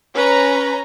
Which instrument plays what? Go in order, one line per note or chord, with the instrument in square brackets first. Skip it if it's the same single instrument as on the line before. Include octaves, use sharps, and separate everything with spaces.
[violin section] C#4 A#5 [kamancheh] B4